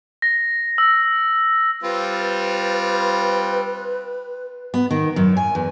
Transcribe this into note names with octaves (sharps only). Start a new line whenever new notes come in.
A#6
E6
G3 C4 F4 B4
B3
D#3
F#2
G#5
E2